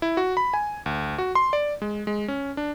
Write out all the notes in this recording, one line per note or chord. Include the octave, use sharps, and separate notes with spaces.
E4
F#4
B5
G#5
D2
F#4
C6
D5
G#3
G#3
C#4
D4